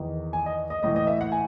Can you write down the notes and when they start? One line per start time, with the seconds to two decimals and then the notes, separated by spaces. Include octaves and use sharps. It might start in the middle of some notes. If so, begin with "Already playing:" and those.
Already playing: E2 D#3
0.33 G#5
0.46 D#5
0.70 D#5
0.83 A2 E3 D#5
0.96 D#5
1.07 E5
1.21 F#5
1.32 G#5